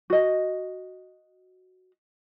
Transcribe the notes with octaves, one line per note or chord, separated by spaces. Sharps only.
F#4 D#5